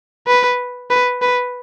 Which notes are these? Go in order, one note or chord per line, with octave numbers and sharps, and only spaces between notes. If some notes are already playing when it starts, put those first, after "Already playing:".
B4
B4
B4